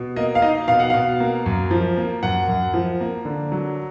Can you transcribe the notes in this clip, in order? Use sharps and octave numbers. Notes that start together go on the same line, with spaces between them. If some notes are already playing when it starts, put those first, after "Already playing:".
Already playing: B2
A#3 D#5
F5
D#4 D#5
B2 F5
F#5
B2 F5
A#3
F#2
F3
A#3
F#2 F#5
F#2
F3
A#3
D3
F#3